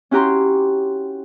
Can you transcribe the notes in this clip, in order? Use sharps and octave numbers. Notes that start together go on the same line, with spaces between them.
C#4 E4 F#4 G4 A#5 C6